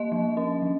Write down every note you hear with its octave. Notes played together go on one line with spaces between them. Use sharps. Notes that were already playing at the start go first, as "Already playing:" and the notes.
Already playing: A#3 D#5
F3
C#4
F3